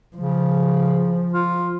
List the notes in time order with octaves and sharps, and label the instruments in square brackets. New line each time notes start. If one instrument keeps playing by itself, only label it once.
[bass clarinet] C#3 [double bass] F3
[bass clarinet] F4